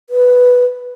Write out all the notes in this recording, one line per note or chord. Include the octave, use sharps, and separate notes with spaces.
B4